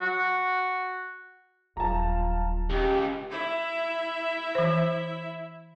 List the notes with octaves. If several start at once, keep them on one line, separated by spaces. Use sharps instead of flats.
F#4
D#1 F#3 F4 A5 A#5
C#2 G4
E4 E5
E3 C5